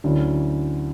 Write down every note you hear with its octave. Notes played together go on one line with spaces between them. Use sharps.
D2 D3 F#3 C#4 E4